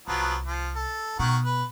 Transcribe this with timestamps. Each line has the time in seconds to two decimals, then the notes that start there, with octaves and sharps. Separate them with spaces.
0.08 C2 F3 F#3 B3
0.46 F3
0.76 A4
1.19 B2 D#3 F#5 C#6
1.43 B4